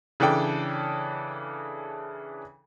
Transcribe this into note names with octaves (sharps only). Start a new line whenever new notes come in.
C#3 E3 D4 A4 G5